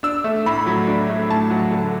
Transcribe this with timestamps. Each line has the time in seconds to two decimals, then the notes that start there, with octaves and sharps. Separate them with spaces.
0.03 D4 E6
0.24 A3
0.46 A2 B5
0.66 F#3
0.87 D4
1.09 A3
1.29 A2 A5
1.50 F#3
1.72 D3